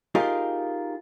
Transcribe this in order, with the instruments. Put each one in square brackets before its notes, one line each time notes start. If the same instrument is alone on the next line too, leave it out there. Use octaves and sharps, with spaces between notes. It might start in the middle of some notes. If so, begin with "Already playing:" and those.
[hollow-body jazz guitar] D#4 F4 G4 G#4 A#4